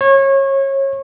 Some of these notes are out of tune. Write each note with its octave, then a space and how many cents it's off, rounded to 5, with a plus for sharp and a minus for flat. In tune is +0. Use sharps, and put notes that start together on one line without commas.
C#5 -25